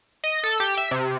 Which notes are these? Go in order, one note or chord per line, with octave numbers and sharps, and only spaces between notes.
D#5
A4
G4
E5
C3